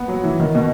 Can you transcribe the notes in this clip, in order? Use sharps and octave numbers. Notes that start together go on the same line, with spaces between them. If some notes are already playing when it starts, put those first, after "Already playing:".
Already playing: B3
F#3
E3
D#3
B2